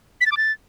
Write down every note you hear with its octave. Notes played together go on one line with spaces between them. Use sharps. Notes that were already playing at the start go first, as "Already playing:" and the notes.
B6
A6
D6
A6